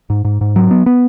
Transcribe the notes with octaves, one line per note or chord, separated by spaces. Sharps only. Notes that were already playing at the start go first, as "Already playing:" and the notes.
G#2
G#2
G#2
F#3
B3
B3